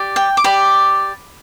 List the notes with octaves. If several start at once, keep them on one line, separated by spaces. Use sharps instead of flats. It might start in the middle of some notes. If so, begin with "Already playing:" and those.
Already playing: G4 D5
G5
D6
G4 D5 B5